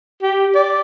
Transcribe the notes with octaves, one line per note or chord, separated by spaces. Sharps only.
G4
D5